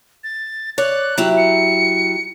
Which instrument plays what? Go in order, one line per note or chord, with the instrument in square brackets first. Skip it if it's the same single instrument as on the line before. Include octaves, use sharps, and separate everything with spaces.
[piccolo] A6
[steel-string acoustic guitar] C#5 D5 [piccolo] F#6
[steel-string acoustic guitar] F#3 E4 G4
[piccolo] C#7